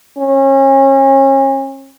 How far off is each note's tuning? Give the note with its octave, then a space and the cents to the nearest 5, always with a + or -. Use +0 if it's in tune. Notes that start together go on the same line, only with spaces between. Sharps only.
C#4 -35